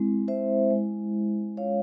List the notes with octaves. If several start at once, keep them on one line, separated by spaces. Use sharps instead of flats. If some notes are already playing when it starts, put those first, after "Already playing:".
Already playing: G#3 C4 E4
C5 E5
G#3 E4
G#3 C#4 F4 C#5 F5